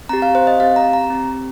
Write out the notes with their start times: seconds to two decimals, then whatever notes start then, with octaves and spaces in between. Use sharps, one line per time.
0.09 C4 G4 A#5
0.22 F5
0.35 C5
0.47 D#5
0.60 C4 G4 F5
0.76 A#5
0.93 A#5
1.10 C4 G4